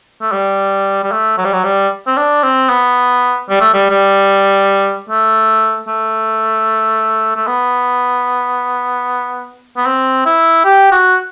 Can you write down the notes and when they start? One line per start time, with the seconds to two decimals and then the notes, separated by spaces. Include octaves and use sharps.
0.21 A3
0.32 G3
1.04 G3
1.12 A3
1.38 F#3
1.45 G3
1.53 F#3
1.64 G3
2.07 C4
2.17 D4
2.43 C4
2.70 B3
3.50 G3
3.61 A3
3.74 G3
3.90 G3
5.09 A3
5.88 A3
7.36 A3
7.47 B3
9.77 B3
9.86 C4
10.26 E4
10.65 G4
10.92 F#4